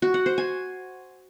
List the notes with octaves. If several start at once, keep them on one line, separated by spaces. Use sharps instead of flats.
F#4
F#5
C5
G#5